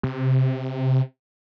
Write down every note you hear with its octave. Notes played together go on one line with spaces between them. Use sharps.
C3